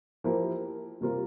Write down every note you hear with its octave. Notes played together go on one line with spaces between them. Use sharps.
F3 A#3 E4 G4 A#4
C3 G3 A#3 F4 A#4